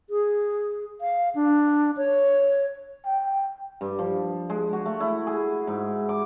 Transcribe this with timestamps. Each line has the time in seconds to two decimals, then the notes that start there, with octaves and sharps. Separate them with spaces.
0.10 G#4
1.01 F5
1.35 D4
1.97 C#5
3.06 G5
3.81 G2
3.99 F3
4.50 G#3
4.73 F#4
4.86 A3
5.00 E4
5.27 G#4
5.67 G#2
6.09 D6